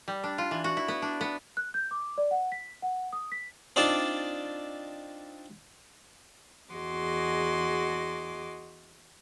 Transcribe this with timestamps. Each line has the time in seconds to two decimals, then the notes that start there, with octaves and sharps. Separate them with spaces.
0.08 G3
0.24 D4
0.38 F4
0.51 E3
0.64 F#4
0.77 E4
0.88 B3
1.02 D4
1.21 B3
1.57 F#6
1.74 G6
1.91 D6
2.18 D5
2.31 F#5
2.52 B6
2.82 F#5
3.13 D#6
3.32 B6
3.76 C4 D4 D#4 F4 D5 A5
6.73 E2 F#4 G#4 D#5 C6 D6